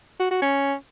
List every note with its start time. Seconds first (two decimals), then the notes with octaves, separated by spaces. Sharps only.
0.20 F#4
0.31 F#4
0.42 C#4